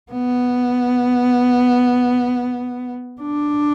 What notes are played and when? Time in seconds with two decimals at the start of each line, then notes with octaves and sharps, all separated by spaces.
0.11 B3
3.21 D4